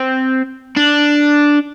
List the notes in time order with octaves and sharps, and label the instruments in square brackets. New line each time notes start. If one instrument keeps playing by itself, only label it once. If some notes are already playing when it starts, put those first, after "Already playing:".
Already playing: [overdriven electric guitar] C4
D4